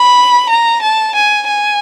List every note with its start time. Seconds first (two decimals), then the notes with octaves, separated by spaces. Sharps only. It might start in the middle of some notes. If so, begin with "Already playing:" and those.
Already playing: B5
0.50 A#5
0.82 A5
1.16 G#5
1.48 G#5